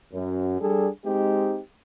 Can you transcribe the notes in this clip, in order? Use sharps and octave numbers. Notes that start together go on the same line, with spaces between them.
F#2
G3 D4 G#4 A4
G#3 C4 D#4 G4